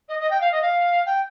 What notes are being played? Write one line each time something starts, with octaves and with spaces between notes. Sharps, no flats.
D#5
D#5
G5
F5
D#5
F5
G5